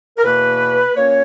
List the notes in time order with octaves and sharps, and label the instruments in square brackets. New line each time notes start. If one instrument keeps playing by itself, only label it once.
[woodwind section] A#4
E2 B2 A#3 B4
A#2 A#3 C#4 C#5